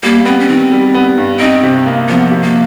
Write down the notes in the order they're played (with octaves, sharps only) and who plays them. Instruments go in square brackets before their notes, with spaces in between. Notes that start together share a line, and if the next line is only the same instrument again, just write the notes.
[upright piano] G3 [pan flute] A#3
[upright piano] B3 [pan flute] C4
[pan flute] C#4
[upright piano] D#3 [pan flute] C4
[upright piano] G3
B3
G2
[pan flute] C4 [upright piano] D#4
[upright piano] C3
A#3
[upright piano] F3 [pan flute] B3
[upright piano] C3
[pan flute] A#3